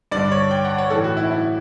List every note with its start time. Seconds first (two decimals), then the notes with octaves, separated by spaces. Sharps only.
0.12 G2 D3 D5
0.32 C#5
0.51 G5
0.65 F#5
0.78 C#5
0.90 A2 E3 A4
1.04 F#4
1.17 E4
1.31 E4